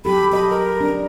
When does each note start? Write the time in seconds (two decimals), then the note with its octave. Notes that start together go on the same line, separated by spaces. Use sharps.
0.05 F#3 G4 A4 B5
0.32 A4 D#5 B5
0.49 A#4
0.81 D4